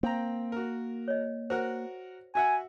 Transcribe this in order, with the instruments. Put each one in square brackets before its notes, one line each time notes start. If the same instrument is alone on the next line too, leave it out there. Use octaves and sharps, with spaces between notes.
[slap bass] A#3 [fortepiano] C4 G5 A#5
[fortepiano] F#4 A#4
[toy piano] C#5 D#5
[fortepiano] F#4 A#4 F#5 [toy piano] C5
[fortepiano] F#4 E5 F#5 [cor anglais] G#5